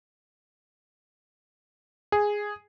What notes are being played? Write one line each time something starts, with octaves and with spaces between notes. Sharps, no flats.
G#4